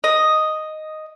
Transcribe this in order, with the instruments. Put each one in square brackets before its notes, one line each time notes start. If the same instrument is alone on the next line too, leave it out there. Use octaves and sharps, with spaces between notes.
[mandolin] D#5